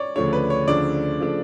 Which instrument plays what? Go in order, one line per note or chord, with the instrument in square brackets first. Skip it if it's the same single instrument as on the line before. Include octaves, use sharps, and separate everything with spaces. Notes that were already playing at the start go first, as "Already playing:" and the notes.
Already playing: [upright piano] C#5 D5
[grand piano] D2 C#3 F3 A3 D4 [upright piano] C#5
[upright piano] B4
C#5
[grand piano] D2 C#3 F3 A3 D4 [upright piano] D5
[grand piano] C#3 F3 A3 D4